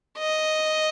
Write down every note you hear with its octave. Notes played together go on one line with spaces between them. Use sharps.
D#5